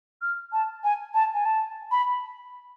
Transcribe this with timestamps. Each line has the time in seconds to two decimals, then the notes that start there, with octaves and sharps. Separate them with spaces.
0.22 F6
0.52 A5
0.84 G#5
1.14 A5
1.34 G#5
1.45 A5
1.91 B5